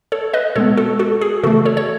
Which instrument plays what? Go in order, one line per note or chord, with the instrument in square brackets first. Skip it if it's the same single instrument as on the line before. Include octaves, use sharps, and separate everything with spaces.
[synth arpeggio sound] A4 C#5
B4 D#5
B2 G#3 B3 A4 C#5
F#4 A4
F#4 A4
G#4
C#3 E3 A3 F#4 A4
A4 C#5
C#5